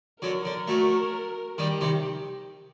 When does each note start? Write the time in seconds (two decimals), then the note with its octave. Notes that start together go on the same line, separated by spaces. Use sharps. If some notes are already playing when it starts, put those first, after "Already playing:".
0.22 D3 F#3 A#4
0.45 D3
0.68 F#3 A3
1.58 D#3 G3 G4
1.81 C3 D#3